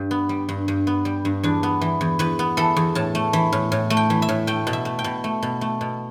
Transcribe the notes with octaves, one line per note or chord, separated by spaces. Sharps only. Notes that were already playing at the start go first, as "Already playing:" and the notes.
Already playing: G2
B3
G3
G2
G2
B3
G3
G2
E2 D4
B3
E3
E2
E2 B4
B3
E3 A4
E2
A2 A5
A3
E3
A2
A2
A3
G5
E3
E5
A2
A3 G5
B2
E5
A3
G5
B2
A3
B2
A3
B2